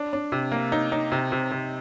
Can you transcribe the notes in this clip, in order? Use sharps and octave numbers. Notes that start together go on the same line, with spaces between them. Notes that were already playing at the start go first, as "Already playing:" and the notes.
Already playing: D4
D4
C3
A#3
D#4
D#4
C3
C3
C3